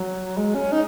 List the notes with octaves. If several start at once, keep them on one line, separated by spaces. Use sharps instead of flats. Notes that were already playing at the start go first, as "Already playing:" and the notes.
Already playing: F#3
G#3
C#4
D#4